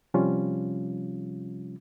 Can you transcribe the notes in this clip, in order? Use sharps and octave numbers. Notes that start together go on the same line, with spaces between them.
C3 F3 G3 C#4 F4